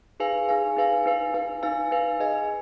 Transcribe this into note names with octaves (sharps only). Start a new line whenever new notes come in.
D#4 G#4 B4 F5 G#5
D#4 G#4 B4 F5 G#5
D#4 G#4 B4 F5 G#5
D#4 B4 F5 G#5
D#4 B4 F5 G#5
D#4 B4 F5 G#5
D#4 B4 F5 G#5
G#4 B4 D#5 G#5